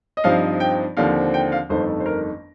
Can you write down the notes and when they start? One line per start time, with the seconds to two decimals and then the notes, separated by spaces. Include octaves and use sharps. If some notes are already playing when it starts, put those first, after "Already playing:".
0.17 D#5
0.24 G2 F3 C4 D#4 F5
0.60 G5
0.97 D#2 D3 F3 C4 F5
1.34 G5
1.52 F5
1.69 G1 F2 D#3 A3 C5
2.00 C5
2.06 A#4